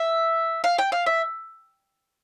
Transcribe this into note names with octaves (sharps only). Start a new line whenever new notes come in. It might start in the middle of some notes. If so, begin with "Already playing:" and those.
Already playing: E5
F5
G5
F5
E5